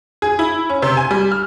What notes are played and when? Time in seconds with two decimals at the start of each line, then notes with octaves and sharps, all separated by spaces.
0.22 G#4
0.39 E4
0.69 C#4
0.82 C3
0.97 G#5
1.11 G3
1.32 F6